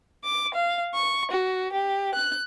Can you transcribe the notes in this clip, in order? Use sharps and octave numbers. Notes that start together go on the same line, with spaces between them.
D6
F5
C#6
F#4
G4
F#6